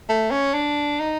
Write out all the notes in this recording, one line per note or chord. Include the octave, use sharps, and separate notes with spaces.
A3
C#4
D4
D#4